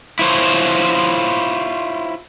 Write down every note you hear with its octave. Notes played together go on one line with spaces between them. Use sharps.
E4 F4 C5 C#5